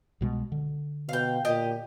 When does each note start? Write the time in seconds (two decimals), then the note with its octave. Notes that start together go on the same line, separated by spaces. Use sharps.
0.21 C2 B2 G#3
0.52 D3
1.09 B2 F5 G5
1.45 A#2 G4 D#5